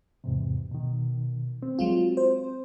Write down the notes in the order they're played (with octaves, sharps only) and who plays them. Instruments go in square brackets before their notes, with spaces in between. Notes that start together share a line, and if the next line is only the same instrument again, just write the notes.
[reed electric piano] E2 G#2 C3
B2 D#3
C4
[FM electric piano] F#3 G#3 F4
C5